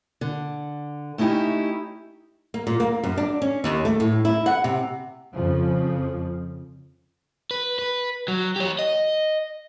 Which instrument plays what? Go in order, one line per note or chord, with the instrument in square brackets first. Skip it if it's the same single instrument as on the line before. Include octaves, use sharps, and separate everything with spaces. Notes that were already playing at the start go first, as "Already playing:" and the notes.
[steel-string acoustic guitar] D3
A3 C#4 D#4 E4 G4
[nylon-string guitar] A#3
A#2
A#3
F#2
D4
C#4
D#2
A3
A2
E4
F#5
C3
[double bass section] F2 C#3 F3
[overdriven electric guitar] B4
B4
F#3
G4 C#5
D#5